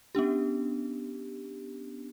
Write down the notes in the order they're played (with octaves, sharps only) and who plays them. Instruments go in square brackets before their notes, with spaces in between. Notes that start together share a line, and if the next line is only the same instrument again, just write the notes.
[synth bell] B3 C#4 D4 G4